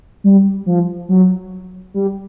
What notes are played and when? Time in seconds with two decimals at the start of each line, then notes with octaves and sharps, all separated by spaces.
0.24 G3
0.66 F3
1.09 F#3
1.94 G3